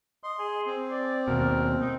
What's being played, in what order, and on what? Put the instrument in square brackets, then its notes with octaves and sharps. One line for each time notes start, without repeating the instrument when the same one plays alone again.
[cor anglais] D#5 [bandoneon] C6
[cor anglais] G#4
[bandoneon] C4
[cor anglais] D5
[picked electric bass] D#2 B2 [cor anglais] A#4
[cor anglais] D#4